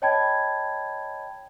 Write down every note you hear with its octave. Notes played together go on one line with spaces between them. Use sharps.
C#5 D#5 G5 A5 B5 G#6